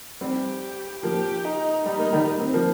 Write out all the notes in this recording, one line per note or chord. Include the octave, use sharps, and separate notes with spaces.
G3 C4 G4
F3 A#3 G4
D#4
G3 D#4
A#3
D#3 G3
A#3
C4
F3 A#3